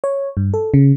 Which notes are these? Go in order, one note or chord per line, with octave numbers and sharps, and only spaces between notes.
C#5
G2
A4
C#3